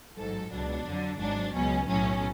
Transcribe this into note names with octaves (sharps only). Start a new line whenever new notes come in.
A1 G#2 F#3 A4
C#2 B2 F#3 D4
F2 D3 F#3
G#1 G#2 F#3 D4
C#2 B2 F#3 C#4
B1 A2 F#3 C#4